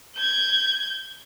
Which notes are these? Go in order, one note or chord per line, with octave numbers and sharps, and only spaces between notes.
G6 G#6